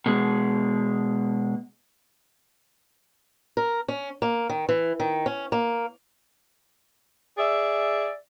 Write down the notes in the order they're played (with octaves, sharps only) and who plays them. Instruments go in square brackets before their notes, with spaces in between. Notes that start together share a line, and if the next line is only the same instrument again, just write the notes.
[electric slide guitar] B2 G#3
[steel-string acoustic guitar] A#4
C#4
A#3
D#3
E3
D#3
C#4
A#3
[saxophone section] G#4 D5 E5